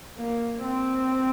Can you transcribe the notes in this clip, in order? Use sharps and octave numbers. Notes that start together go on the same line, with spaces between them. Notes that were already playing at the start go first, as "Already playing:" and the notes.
A#3
C4